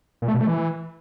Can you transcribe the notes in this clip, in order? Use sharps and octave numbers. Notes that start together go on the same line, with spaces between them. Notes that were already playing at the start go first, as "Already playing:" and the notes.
A#2
A3
B2
A3
E3